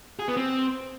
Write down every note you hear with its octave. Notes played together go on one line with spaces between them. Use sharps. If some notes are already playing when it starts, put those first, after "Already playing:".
G#4
B3
C4